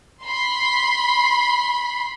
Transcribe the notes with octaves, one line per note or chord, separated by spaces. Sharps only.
B5 C6